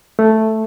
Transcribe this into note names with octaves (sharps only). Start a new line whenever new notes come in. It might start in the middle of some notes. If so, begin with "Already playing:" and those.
A3